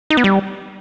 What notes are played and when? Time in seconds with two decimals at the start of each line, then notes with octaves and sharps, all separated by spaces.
0.10 D#4
0.17 B3
0.24 G3